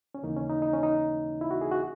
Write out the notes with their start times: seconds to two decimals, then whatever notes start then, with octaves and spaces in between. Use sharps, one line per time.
0.15 C#4
0.23 D#2 C#3 E3 A#3 D#4
0.37 C#4
0.49 D#4
0.62 D#4
0.73 C#4
0.83 D#4
1.41 E4
1.51 F#4
1.61 G#4
1.71 F#4